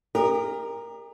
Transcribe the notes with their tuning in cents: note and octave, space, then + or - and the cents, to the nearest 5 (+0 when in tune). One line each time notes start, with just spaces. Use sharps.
G4 +40 A#4 +0 D#5 -20